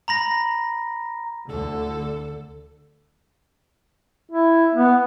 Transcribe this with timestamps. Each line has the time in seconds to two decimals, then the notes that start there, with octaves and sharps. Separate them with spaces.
0.08 A#5 B5 A#6
1.49 D2 D3 A4
4.32 E4
4.75 B3